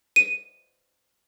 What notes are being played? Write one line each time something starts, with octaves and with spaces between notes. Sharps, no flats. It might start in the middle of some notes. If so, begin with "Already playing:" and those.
D#7